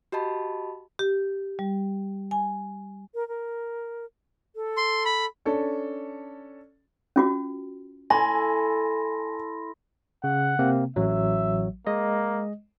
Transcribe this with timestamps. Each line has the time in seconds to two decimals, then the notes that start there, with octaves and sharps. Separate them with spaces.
0.12 F#4 G4 D#5 A5 B5
0.99 G4
1.59 G3
2.31 G#5
3.15 A#4
3.28 A#4
4.56 A4
4.77 C6
5.05 B5
5.45 C#4 D4 A4
7.16 C#4 F4 F#4
8.10 E4 A4 G#5 B5 C6 A#6
10.24 C#3 F#5
10.59 C3 A#3 C4
10.96 A1 F#3 E5
11.87 G#3 A#3 D#5